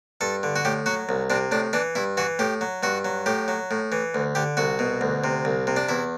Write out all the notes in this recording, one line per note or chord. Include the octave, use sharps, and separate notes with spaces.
G2 A4
D3
F#4
A2 G4
F#3 F#4
C2
C3 D4
A2 D4
E3 D4
G2 E4
E3 F#4
A2 G4
F#3
G2 F#4
F#3
A2 G4
F#3
A2
E3
D2
D3 G4
C2 F#4
B2
D2
C3
C2
C3
D4
E2 E4